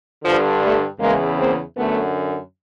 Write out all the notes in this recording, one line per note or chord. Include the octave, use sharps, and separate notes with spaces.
G2 D3 F3
G3 A3
E2 C#3 E3 G#3 A#3
A#3 C4
F#2 D3 A3 B3